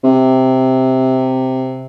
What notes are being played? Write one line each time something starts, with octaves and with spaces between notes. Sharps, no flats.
C3